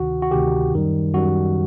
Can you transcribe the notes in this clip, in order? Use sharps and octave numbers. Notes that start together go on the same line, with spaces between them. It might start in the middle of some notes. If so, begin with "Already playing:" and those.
Already playing: D2 C3 D#3 F#4
F#4
D2 C3 D#3 G4
F#2 D#3 G3
F#2 D#3 G3 F#4